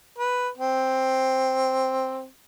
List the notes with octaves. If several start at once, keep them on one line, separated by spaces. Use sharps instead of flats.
B4
C4